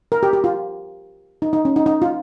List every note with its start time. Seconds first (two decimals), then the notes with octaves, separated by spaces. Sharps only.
0.12 A#4
0.23 G4
0.33 G4
0.44 F4
1.42 D#4
1.53 D#4
1.65 C#4
1.76 D#4
1.86 D#4
2.02 F4